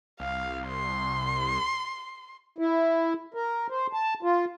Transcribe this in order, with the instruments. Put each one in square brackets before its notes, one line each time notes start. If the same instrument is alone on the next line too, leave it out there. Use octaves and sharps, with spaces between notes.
[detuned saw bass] C2 [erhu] F5
[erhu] C6
[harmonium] E4
A#4
C5
A5
F4